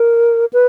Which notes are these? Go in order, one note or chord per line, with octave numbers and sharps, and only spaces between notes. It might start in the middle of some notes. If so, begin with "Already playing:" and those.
Already playing: A#4
B4